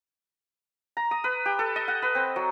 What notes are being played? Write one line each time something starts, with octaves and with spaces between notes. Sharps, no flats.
A#5
D#6
B4
G4
A4
D#5
F#5
B4
C4
F#3